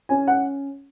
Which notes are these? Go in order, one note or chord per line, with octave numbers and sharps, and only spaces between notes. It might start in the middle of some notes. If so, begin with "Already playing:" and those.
C#4 G#5
F#5